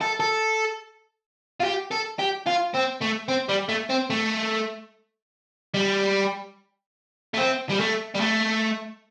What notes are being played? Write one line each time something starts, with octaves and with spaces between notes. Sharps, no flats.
A4
A4
F4
G4
A4
G4
F4
C4
A3
C4
G3
A3
C4
A3
G3
A3
C4
G3
A3
G3
A3